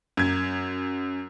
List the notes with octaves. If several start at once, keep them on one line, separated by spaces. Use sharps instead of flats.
F#2 G#6